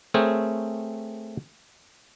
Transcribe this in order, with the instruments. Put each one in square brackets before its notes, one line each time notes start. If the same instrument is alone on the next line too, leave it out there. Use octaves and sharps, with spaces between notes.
[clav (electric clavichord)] A3 C4 G#4 A#4 C#5 G5